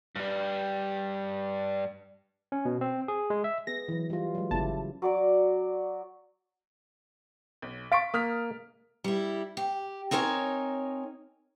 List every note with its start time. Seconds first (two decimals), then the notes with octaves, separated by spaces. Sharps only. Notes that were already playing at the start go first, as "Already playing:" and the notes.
0.16 G2 G3
2.52 C#4
2.65 B2
2.81 C4
3.08 G#4
3.30 G#3
3.44 E5
3.67 B3 G#4 A#6
3.88 E3 F#3
4.10 G3 F4
4.35 F#3 G#3
4.51 G1 C#3 E4 G4 A5
5.02 F#3 D5 D6
7.62 B1
7.92 F5 C6 C#6 A6 B6 D7
8.14 A#3 D#6 F6 B6
9.04 G3 E4
9.57 G4
10.11 C4 D#4 A#4 C#5 G#5